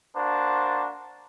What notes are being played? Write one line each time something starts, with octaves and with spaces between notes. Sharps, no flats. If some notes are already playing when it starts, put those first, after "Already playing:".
A#3 D4 F#4 C5 A5